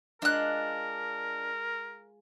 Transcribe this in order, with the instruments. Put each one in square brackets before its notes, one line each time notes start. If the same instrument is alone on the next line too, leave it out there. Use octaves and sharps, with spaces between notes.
[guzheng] G#3 F4 [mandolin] D4 F#6 [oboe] A#4